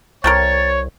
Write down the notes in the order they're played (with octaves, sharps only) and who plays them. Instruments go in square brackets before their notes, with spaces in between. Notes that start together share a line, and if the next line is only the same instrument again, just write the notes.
[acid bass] C2 [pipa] C4 A4 A#4 [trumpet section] C#5 [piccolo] A6